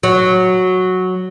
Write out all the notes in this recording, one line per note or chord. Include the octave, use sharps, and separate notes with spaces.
F#3